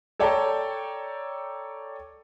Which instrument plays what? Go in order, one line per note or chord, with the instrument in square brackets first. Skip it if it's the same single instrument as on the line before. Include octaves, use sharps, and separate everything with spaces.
[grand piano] A4 C#5 D5 G5 A5 A#5